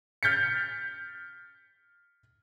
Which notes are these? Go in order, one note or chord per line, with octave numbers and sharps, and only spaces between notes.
F6 G6 A6 B6 C#7